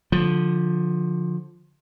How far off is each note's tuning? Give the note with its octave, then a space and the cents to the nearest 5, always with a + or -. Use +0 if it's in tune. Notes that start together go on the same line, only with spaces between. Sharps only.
D3 +0 F3 +15